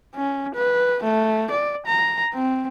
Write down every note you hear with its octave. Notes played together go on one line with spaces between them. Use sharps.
C#4
B4
A3
D5
A#5
C4